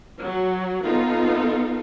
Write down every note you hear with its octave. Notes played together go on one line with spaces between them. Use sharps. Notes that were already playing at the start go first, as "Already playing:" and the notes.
F#3
B3 D#4 F4 A4